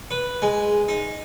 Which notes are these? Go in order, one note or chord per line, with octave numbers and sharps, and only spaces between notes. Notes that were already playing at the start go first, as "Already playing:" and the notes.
B4
G#3
D#4